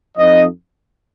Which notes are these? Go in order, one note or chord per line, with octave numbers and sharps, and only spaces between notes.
F2 F3 C4 D#4 D#5